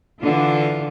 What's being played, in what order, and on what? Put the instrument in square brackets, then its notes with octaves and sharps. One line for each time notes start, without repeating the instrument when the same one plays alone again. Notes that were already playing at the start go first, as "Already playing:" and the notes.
[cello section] D3 E3 F4